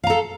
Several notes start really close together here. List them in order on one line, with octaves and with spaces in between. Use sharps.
F5 A#5 A4